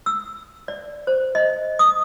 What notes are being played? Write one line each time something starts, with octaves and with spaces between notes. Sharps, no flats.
E6
D5
C5
D#5
D#6